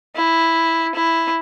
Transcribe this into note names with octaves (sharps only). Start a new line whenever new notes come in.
E4
E4